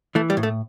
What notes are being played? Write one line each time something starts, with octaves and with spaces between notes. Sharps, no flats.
E3 A3
G3
A2
A3